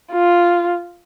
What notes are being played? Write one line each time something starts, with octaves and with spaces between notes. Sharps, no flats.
F4